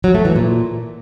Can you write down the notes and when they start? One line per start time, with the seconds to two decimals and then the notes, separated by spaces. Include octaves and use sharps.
0.04 F#3
0.15 A3
0.25 E3
0.36 A#2